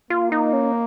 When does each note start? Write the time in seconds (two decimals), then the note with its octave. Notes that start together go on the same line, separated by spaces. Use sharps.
0.10 A#3 F4
0.32 D#4
0.53 C#4